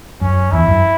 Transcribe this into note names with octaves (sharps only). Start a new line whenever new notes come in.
F#2 C#4
E2 E4
F#2